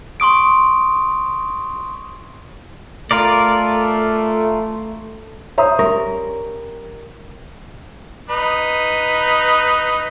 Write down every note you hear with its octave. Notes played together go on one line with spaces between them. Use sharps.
C6 C#6 D#6 D7
A3 F4 A#4 D5
C5 C#5 E5 A#5 D#6
G3 C#4 A#4 C#6 A#6
D#4 B4